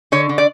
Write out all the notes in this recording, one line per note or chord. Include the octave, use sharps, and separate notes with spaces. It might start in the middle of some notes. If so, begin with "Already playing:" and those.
D3 C#5
D3
D5